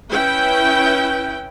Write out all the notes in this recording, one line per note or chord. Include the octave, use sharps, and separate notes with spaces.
C#4 E4 B4 G5